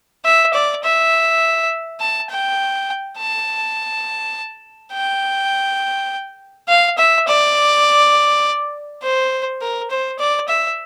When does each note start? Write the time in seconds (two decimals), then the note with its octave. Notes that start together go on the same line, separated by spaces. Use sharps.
0.25 E5
0.54 D5
0.84 E5
2.00 A5
2.30 G5
3.18 A5
4.93 G5
6.68 F5
6.98 E5
7.27 D5
9.03 C5
9.61 A#4
9.91 C5
10.19 D5
10.48 E5